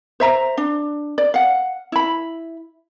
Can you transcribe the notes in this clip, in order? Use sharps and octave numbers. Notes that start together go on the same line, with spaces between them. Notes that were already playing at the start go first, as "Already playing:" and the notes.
C5 E5 A#5
D4
D5
F5 F#5
E4 B5